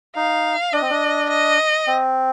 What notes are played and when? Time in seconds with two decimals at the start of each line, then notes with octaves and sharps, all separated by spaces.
0.16 D#4 F5
0.73 D4 D#5
0.82 C4
0.90 D4
1.30 D#5
1.87 C4